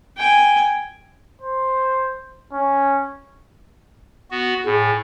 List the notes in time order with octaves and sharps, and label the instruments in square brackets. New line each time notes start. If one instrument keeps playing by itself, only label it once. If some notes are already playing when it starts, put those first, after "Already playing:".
[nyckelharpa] G5 G#5
[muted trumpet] C5
C#4
[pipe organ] B3 F#4
[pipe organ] A2 [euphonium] G#4